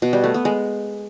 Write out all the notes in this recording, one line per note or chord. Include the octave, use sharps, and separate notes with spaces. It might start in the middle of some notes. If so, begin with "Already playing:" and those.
B2
G3
A3
B3
G#3